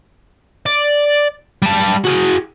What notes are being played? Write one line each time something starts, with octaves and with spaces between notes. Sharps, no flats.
D5
G3 A5
F#4 G#4